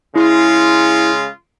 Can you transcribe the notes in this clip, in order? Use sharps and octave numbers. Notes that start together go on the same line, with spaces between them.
C#3 G#3 E4 F4